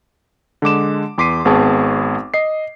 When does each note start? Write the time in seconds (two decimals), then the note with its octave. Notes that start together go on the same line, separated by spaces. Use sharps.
0.62 D3 G#3 D6 E7
1.18 E2 C6 D6 B6 C7 D#7
1.45 G#1 B3 C4 G#4 A5 C#6
2.34 D#5 C7